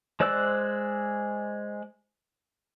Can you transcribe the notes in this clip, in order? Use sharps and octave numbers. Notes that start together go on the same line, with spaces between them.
G#3 C5 D5 E6 F#6